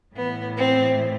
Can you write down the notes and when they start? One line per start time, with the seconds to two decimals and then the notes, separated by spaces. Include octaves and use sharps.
0.15 A2 E3 B3
0.57 C4